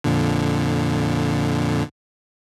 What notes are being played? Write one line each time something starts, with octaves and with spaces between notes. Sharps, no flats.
F2 A#2 D3